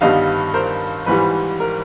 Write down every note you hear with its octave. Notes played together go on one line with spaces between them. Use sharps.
G1 G2 D#3 G3 B3 D#5 F5
A#4 C5
G#1 G#2 E3 G3 B4
A#4